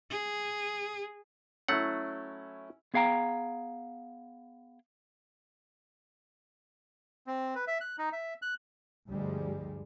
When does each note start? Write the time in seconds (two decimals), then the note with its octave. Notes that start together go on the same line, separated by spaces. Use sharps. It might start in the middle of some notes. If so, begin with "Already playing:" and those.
0.10 G#4
1.68 F#3 A3 C#4 E4 F#5
2.94 B3 G#4 F5 G5 A#5
7.27 C4
7.55 B4
7.67 E5
7.81 F#6
7.98 D#4
8.13 E5
8.42 F#6
9.08 D2 G2 F3 G3 G#3